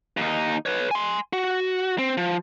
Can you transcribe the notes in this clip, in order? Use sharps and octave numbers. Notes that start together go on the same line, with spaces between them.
D#2 D#4
B4 C#5
G#5 C6
F#4
C4
F3